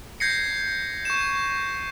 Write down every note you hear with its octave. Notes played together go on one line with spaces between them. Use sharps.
G6 G#6 A#6 C7 C#7
C#6 G6 E7